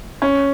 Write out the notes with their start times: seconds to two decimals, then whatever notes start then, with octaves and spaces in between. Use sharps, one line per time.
0.22 C#4